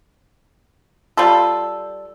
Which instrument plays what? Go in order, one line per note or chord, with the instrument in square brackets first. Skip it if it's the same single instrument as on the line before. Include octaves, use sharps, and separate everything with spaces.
[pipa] G3 F4 A4